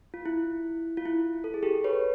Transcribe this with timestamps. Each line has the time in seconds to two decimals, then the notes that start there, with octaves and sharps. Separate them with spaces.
0.14 F4
0.26 E4
0.97 F4
1.06 E4
1.44 A4
1.54 G#4
1.63 G4 A4
1.84 B4 C#5